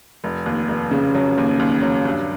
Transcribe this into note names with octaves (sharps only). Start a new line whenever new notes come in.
F1
D#2
F1
C#3
F#3
D#2
D#2
F#3
G2